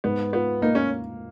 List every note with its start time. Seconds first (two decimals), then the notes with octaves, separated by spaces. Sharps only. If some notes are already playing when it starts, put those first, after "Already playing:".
0.04 G#2 B3
0.33 B3 F4
0.62 A#3 D#4
0.75 C#4